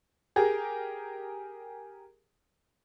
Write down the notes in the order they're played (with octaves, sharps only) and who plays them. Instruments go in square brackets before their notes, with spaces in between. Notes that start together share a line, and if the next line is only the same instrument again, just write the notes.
[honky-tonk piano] G4 G#4 A#4